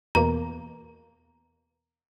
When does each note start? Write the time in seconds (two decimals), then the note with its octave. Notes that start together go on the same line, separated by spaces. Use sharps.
0.15 E2 B2 A#3 A#5